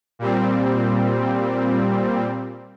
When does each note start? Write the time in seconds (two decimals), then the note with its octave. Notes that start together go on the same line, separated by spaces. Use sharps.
0.19 A#2 G3 C4